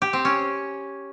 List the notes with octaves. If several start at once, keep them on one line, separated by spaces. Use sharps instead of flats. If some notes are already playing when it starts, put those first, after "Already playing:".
G4
C4
C#4